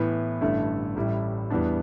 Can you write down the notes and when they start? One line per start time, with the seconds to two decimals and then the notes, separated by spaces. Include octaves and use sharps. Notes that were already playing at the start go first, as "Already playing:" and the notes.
Already playing: A2 E3 B3
0.41 A1 G2 D3 A3 E4
0.96 A1 A2 G3 E4
1.50 E2 E3 G3 B3 D4